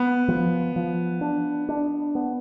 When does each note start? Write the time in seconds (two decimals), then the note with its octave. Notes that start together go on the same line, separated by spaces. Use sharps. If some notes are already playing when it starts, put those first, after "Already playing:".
Already playing: B3
0.28 F3
0.76 F3
1.21 D4
1.69 D4
2.15 B3